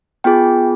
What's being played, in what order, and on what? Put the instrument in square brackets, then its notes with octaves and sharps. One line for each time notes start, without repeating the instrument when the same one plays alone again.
[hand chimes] B3 F4 G#4 G5